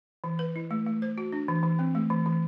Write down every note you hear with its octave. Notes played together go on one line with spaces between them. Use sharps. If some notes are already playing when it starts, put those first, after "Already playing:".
E3
B4
E4
A3
A3
C5
F#4
D4
E3
E3
C4
A3
E3
E3